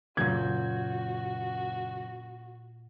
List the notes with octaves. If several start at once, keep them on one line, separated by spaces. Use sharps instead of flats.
F#1 A#2 F#4 G6 G#6